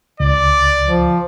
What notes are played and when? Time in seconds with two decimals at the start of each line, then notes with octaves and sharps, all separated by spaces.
0.20 C#2 D5
0.86 F3